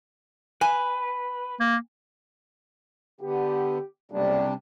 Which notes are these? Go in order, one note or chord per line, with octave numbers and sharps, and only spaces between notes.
B4 G#5
A#3
D3 B3 G4
F#1 B1 C3 G3 D4